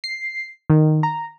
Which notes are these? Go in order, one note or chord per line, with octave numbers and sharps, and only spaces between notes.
C7
D#3
A#5